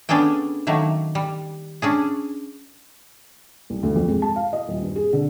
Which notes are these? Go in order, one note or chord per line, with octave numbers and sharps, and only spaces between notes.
B3 C#4 D4 G#4 A4 G5
D#3 F#3 A3 A#3
G3
C#4 D4 G#4
C2
D2
F2
G#3
A5
F5
D#5
D#1
G2
G#4
D3